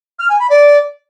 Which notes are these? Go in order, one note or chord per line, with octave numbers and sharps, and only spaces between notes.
F6
G#5
B5
D5